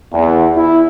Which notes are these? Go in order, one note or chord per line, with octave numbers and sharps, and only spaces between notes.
E2
E4